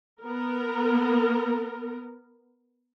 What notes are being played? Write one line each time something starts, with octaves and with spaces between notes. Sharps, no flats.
B3 A#4